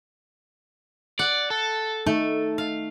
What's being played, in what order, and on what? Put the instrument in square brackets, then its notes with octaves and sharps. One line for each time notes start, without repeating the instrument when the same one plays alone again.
[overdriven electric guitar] D5 [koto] F#5
[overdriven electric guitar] A4
[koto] A3 [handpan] D#4
[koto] F5